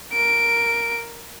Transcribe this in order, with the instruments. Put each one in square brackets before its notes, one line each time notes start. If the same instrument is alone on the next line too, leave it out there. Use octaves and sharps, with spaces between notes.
[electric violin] A#4 D7